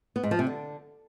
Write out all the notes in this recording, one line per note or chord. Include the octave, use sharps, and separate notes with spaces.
B3
G#2
F3
C3
D3